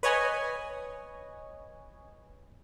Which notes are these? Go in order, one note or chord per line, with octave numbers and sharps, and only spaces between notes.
B4 C#5 D#5 G#5